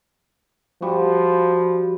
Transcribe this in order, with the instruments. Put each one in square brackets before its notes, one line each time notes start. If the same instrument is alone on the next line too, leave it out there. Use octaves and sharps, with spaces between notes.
[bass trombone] F3 [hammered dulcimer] G3 F#4